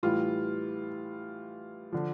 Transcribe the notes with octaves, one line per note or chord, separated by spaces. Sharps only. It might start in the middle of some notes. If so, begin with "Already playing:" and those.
A2 E3 G3 F4
D3 F3